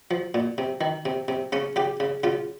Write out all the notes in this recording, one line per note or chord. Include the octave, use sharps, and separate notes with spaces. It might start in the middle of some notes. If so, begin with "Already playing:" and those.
F3
A#2
C3
D#3
C3
C3
C#3 C#4
C#3 G4
C#3
C#3 F4